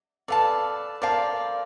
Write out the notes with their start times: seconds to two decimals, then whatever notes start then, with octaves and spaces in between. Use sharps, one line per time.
0.28 A4 B4 D5 F5 A5
1.02 A#4 C5 D5 F5 A5